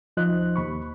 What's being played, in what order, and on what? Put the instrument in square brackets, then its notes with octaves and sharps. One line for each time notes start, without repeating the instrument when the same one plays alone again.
[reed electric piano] D#2 F3 D#4 C5 D#5 F#6
D#2 B5 C#6